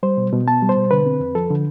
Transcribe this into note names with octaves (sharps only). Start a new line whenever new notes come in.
G3 C5
B2
B2
B3 A5
G3
C5
B2
D3 B4
C4
F2
F3 A4
D3